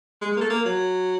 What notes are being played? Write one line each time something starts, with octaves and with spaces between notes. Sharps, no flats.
G#3
G#3
A#3
A3
A#3
F#3